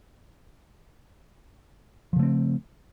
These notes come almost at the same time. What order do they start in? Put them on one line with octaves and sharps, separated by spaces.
F3 C#3 A3 C4